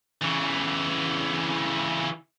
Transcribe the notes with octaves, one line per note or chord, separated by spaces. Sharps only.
C#3 E3